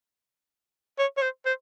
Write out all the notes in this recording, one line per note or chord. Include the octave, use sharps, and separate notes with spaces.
C#5
C#5
C5
C5